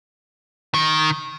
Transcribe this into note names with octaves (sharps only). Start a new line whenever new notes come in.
D#3